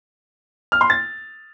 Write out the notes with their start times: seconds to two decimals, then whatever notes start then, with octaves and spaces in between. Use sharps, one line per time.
0.72 F6
0.81 C6
0.90 A6